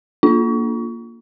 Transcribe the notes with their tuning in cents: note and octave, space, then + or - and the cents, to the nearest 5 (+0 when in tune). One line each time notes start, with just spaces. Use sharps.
A#3 +0 D4 +0 F4 +0